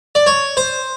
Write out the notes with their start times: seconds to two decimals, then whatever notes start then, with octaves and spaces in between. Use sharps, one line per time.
0.15 D5
0.27 C#5
0.57 C5